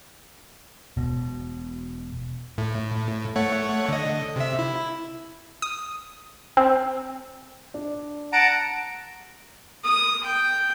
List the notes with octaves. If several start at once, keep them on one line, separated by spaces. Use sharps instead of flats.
E1 B2
A2
A3 C#5 F#5
D3 D#5
C3 E5
E4
D#6
C4
D4
F#5 A5 A#5 D7
D#6
G5